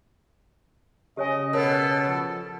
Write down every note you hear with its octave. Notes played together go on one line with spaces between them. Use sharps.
C#3 G4 C#5 D#5 G#5
B2 A4 A#4 C#5
F3